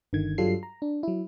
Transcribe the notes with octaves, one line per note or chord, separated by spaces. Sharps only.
G1 D3 D#3 G#6
G2 F#3 G3 F4 A4 C7
A#5
D4
F#3 E4